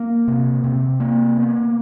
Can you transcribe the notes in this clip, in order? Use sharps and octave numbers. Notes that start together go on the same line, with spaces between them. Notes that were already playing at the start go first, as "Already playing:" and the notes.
Already playing: A#3
C3
C3
A#3
B3